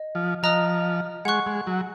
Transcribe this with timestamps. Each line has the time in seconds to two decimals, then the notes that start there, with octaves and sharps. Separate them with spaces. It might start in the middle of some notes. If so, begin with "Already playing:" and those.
Already playing: D#5
0.15 F3
0.43 F3 D#5 A#5 D#6 F#6
1.25 G#3 F#5 C#6 F#6
1.47 G#3
1.67 F#3